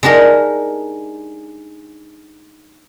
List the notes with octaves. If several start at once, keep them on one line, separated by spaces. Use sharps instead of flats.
G#3 D4 D#4 G4 A#4